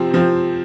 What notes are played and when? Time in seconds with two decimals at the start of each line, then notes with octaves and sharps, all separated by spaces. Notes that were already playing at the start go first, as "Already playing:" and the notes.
Already playing: C3 F3 C4
0.11 C3 F3 C4